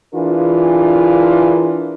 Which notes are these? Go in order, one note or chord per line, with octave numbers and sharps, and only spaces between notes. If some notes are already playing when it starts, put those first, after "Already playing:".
E3 D4 F4 G#4 A#4